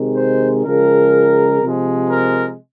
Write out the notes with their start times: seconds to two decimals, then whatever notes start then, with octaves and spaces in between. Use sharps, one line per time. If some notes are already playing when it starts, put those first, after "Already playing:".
Already playing: C3 D#3 G#3
0.16 C5
0.64 C#3 F3 G#3 A#4
1.62 C3 F3 G#3
2.11 A#4